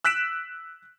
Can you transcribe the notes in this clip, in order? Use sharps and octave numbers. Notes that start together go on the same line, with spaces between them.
E6 F#6 B6 D7 E7